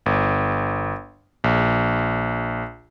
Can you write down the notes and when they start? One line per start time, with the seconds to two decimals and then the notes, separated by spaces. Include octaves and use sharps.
0.06 G1
1.44 A#1